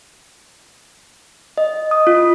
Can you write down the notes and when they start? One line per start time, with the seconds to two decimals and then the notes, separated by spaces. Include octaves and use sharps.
1.58 D#5
1.91 D#6
2.07 F4